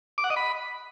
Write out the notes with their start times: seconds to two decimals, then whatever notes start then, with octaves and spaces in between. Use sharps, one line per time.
0.18 D6
0.24 F#5
0.30 D#5
0.36 B5